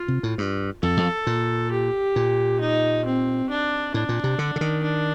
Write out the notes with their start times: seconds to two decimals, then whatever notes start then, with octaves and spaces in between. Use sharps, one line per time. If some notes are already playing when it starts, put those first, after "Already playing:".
Already playing: F4
0.08 C3
0.23 A2
0.38 G2
0.82 F2 A4
0.97 F2
1.27 A#2
1.71 G4
2.16 A#2
2.60 D#4
3.05 C4
3.49 D4
3.94 A2 D4
4.09 A#2
4.24 C3
4.39 D3
4.56 D3
4.61 D#3
4.83 D4